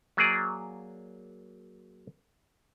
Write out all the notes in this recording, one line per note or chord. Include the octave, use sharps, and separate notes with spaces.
F#3 A#3 G#4 D5